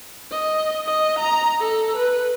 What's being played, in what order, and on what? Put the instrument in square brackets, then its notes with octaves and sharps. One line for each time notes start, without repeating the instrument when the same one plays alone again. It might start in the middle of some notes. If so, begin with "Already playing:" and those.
[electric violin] D#5
D#5
A#5
A4
B4